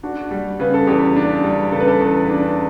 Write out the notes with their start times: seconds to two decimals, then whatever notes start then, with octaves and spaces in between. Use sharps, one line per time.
0.03 D4 F#4
0.31 G3
0.60 C#3 B4
0.74 A4
0.87 E2 G4
1.16 D4
1.44 G3
1.72 C#3 A4
1.80 B4
1.88 A4
2.00 E2
2.29 D4